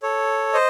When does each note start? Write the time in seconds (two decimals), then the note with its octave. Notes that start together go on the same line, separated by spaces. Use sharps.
0.03 A4 C#5
0.53 C5 D#5